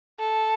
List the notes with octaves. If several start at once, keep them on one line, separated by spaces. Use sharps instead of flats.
A4